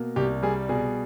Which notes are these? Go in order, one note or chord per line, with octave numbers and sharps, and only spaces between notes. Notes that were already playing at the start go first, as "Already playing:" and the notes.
Already playing: B2 A#3
C2 G4
G3 G#4
B2 G#4